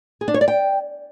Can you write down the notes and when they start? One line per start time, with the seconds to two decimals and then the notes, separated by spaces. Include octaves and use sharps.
0.21 G#4
0.28 D4
0.34 C#5
0.41 D5
0.48 G5